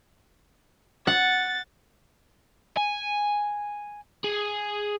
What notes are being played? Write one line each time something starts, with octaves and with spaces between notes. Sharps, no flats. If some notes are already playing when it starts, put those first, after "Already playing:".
F#5 A6
G#5
G#4